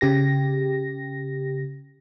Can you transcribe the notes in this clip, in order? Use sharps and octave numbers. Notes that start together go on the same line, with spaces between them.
C#3 G4 A#6